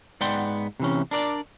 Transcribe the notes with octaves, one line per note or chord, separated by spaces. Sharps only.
G#2 B3 D5 F#5 G5 C6
C3 E3 C#4
D4 A#4 D5